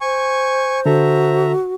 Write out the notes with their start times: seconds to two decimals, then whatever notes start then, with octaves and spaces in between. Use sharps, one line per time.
0.01 C5 G#5 C#6
0.86 D3 F#4 A4 E5 A#5